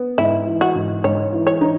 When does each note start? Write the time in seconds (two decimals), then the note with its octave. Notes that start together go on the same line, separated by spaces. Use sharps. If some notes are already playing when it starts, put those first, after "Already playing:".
Already playing: B3
0.18 G#2 E4
0.47 E3
0.61 F#4
0.75 G#2
1.04 G#2 C#5
1.33 E3
1.47 C#5
1.61 D#4